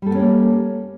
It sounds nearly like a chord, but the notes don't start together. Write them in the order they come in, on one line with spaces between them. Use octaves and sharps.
G3 A4 B3 C#4 A#3